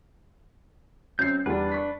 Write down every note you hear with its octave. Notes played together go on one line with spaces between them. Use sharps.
F#2 C4 C5 G6 C7
E2 G3 D4 B4
C#6 B6